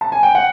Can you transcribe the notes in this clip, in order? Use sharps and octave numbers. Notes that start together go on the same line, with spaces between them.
A5
G#5
G5
F#5